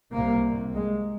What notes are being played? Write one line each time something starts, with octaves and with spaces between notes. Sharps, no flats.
C2 C3 A#3
G#3